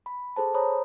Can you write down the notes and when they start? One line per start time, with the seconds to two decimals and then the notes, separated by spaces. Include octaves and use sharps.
0.06 B5
0.36 G#4 A4 C5 A5
0.54 C5 C#5 A#5 B5 D#6